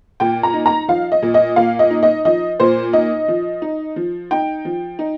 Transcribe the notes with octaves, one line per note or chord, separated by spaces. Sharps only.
A#2 G5
A#5
D#4
A#5
F3 F5
D#5
A#2
D#5
A#2 F5
D#5
D#4
D#5
F3 D#5
A#2 C5
D#4 D#5
F3
D#4
F3
D#4 G5
F3
D#4